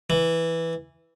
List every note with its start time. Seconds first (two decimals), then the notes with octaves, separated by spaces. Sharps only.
0.10 E3